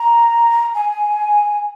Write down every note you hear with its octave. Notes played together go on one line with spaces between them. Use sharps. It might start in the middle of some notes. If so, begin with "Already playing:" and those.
Already playing: A#5
G#5